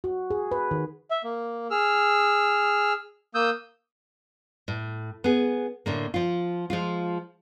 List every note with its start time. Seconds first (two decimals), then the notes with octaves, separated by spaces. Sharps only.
0.04 F#4
0.30 G#4
0.51 B4
0.71 D#3
1.11 E5
1.24 A#3
1.71 G#4 E6 F6
3.35 A#3 D#6 E6 G6
4.68 A2
5.24 B3 G#4
5.86 A2 D3 A#3
6.14 F3 F4
6.70 F3 G#3 F4